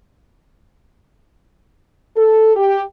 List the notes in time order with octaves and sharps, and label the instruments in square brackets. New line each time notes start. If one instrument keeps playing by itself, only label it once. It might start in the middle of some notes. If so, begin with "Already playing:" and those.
[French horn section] A4
G4